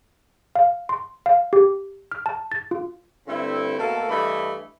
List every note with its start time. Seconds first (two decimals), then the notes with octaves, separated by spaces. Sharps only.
0.56 F5
0.89 C6
1.26 F5
1.53 G4
2.12 F6
2.26 A5
2.52 A6
2.71 F4
3.27 G2 D3 A3 C4 E4
3.78 B2 A3 A#3 A4
4.09 G2 E3 A3 D#5 B5